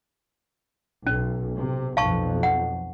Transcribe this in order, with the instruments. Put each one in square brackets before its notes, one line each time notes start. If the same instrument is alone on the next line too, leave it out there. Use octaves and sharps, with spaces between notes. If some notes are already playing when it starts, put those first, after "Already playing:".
[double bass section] B1 [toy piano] C#4
[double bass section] C3
[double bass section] B1 F2 [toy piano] F5 A5 C#6
[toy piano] F#5